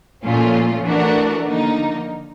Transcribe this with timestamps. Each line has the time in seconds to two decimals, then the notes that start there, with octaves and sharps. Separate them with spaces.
0.24 A#2 F3 A3 C#4 F4
0.84 E3 A3 D4 F#4 A#4
1.45 D3 F3 A#3 D#4